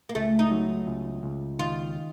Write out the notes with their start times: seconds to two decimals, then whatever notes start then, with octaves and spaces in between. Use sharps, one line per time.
0.09 A#3
0.15 C#2 A3
0.39 D#4
0.51 F#3
0.87 C#2
1.23 C#2
1.59 D#3 F4